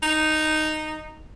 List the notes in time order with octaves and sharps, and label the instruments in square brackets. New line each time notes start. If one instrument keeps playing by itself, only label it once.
[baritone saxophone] D#4